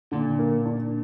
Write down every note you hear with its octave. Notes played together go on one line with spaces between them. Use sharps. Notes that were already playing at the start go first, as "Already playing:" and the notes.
A#2 D3
A#3
D4